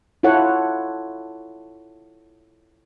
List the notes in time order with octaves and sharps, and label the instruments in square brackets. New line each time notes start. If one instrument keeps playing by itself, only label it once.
[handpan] E4 F4 A4 C#5 F#5